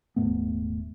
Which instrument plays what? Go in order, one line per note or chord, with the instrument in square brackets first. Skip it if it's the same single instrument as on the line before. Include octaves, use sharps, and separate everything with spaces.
[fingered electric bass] D#1 G#2 A3 B3